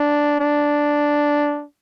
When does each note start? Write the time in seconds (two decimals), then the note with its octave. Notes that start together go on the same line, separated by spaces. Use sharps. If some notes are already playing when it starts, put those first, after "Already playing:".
Already playing: D4
0.40 D4